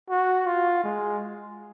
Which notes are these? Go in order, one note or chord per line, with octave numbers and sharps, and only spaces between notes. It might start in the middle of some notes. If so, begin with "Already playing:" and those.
F#4
F4
G#3